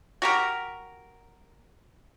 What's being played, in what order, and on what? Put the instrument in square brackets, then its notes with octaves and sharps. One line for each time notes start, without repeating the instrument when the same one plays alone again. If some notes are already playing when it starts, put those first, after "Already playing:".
[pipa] F#4 G4 A#4